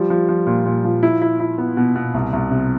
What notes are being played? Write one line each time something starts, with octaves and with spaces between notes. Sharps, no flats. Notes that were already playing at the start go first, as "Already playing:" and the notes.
Already playing: F3 G3
F3
F3
A#2
A#2
F3
E4
E4
E4
B3
B2
B2
C2
C2
C3